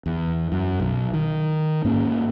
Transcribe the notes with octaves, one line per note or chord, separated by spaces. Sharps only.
E2
F#2
B1
D#3
G#2 A#3 C#4